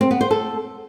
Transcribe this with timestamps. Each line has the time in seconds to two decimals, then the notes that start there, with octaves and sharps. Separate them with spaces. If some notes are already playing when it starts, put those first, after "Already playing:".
0.01 C4
0.11 B3
0.21 C5
0.31 A4